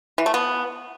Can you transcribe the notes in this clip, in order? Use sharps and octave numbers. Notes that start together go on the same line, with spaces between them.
E3
A3
B3